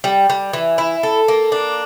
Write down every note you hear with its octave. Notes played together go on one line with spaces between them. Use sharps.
G3
G3
E3
E4
A4
A#3
D4